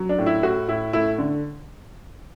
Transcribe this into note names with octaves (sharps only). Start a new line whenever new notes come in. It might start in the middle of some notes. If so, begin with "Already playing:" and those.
Already playing: F#3
D4
A2
E4
A2 F#4
A2 E4
A3 E4
D3